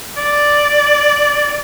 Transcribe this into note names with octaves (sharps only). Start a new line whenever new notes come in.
D5